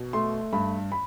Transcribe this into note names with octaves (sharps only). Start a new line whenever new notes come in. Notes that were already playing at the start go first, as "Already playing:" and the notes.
Already playing: B2
A3 C6
G2 B5
B5